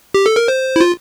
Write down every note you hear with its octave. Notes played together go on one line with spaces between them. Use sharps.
G4
A4
A#4
C5
E4
F4